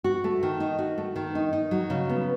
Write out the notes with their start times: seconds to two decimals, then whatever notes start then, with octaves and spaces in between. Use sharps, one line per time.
0.04 F#4
0.24 A3
0.43 D#3
0.60 D#4
0.79 F#4
0.98 A3
1.16 D#3
1.35 D#4
1.53 D#4
1.71 F#3
1.90 C#3
2.09 B3